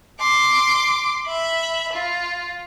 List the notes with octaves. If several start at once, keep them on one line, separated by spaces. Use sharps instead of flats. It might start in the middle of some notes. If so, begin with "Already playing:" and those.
C6 D6
E5 B5
F4